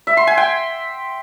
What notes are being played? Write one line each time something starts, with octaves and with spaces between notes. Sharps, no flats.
E5
C6
G#5
G5